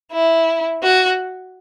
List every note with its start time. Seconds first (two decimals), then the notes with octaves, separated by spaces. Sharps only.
0.12 E4
0.83 F#4